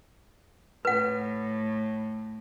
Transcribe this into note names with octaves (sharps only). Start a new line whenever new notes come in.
A2 B4 F#5